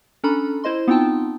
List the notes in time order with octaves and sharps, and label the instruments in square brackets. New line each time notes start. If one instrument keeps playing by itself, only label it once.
[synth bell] C#4 D4 A4 A#5 B5
E4 C5 D#5 C6
B3 C4 D#4 F4 G5 A5